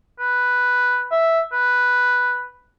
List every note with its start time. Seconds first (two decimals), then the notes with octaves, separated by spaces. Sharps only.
0.19 B4
1.11 E5
1.52 B4